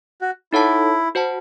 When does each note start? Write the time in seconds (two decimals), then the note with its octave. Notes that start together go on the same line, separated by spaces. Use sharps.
0.21 F#4
0.53 D#4 E4 A4 C#5 F#5 A5
1.15 F#4 C5 F#5 A5